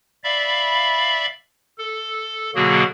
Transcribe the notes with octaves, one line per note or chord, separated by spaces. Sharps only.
D5 E5 F5 B5
A4
B2 D3 F#3 A#3 F#4 G#4